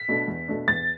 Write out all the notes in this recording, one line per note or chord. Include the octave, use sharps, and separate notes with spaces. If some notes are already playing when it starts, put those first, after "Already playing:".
Already playing: B6
B2 A3 D4
E2
B2 A3 D4
E2 A6